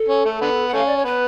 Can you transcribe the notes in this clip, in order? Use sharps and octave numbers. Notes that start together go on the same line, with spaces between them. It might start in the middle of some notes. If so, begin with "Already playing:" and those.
Already playing: A4
C#4
A3
D3 B3
F#5
A3 C#4 F5
D5
C#5
B3 B4